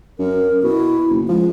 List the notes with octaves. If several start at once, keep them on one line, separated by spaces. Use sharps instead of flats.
F#2 A#4
B2 E4
F#1
F3 G#3